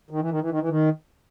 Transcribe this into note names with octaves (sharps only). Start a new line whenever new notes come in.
D#3
E3
D#3
E3
D#3
E3
D#3